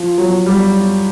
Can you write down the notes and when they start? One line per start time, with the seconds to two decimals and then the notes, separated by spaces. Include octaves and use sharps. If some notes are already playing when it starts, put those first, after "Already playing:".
Already playing: F3
0.18 F#3
0.46 G3